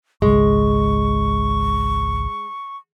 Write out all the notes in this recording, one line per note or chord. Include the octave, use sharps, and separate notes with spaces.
G#1 C#2 G#3 C#6